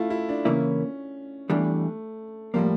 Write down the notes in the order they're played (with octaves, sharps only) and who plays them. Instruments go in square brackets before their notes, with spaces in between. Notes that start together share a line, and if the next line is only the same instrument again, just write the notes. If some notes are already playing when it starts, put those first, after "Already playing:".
Already playing: [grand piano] A3 E4 F4
E4
D4
[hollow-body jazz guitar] C#3 E3 A#3 E4 [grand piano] C#4
[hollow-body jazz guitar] E2 E3 G3 D4 [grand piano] A3
[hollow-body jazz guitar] A2 F3 A#3 [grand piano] G3